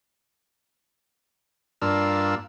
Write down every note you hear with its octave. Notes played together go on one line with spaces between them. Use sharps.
G2 A#3 D4 F4 E6